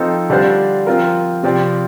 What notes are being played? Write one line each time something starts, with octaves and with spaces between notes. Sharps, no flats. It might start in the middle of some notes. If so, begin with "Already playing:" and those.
Already playing: F3 C4 D#4 A4
D3 G3 D4 F4 C5
F3 C4 F4 A#4
C3 F3 C4 G4 D5